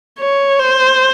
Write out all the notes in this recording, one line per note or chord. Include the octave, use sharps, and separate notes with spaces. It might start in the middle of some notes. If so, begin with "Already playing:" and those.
C#5
C5